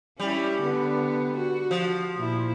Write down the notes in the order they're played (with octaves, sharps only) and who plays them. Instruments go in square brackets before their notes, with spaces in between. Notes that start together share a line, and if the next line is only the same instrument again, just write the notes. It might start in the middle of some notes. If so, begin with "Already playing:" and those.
[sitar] G3 [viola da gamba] C#4 E4
[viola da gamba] D3 B3
F#4
[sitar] F3
[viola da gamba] A#2 E4